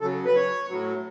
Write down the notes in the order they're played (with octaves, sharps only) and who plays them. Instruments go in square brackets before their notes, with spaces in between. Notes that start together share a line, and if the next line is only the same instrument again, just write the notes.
[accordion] C#3 F#3 A4
B4
C#5
A2 F#3